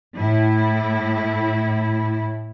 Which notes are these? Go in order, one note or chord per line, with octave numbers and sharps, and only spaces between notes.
A2 E4